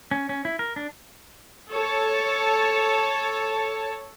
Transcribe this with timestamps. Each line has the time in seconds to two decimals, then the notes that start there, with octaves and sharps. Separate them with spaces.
0.11 C#4
0.29 C#4
0.45 E4
0.59 A#4
0.76 D4
1.72 A4 C#5 A5